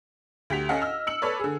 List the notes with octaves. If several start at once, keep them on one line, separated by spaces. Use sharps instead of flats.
D2 G4 B6 F7
C#4 A4 D#5 F5 F#5
D#5 E6 F6
E6 C#7 F#7
A4 B4 C#5 D5
D3 G#4